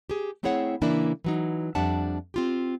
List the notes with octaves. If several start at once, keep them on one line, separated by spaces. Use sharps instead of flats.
G4 G#4
A3 C4 E4 G#4 C#5 F#5
C#3 E3 A#3 D4 E4
E3 F#3 D#4
F2 G3 D4 E5 F#5 A5
C4 F4 G4